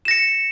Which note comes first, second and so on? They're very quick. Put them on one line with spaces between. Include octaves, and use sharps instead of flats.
E7 A#6 C#7